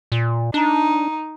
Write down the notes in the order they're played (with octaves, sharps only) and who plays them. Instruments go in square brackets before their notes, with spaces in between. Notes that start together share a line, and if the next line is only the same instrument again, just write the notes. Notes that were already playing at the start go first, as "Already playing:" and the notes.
[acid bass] A#2
[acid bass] D4 [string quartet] D#4